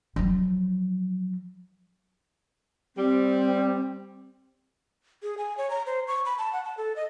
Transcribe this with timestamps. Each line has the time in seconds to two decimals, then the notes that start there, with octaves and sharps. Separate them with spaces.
0.16 F3 F#3
2.96 G3 C4
5.23 G#4
5.38 G#5
5.57 C#5
5.70 A#5
5.86 C5
6.07 C#6
6.26 B5
6.38 A5
6.53 F#5
6.65 A5
6.77 A4
6.96 D#5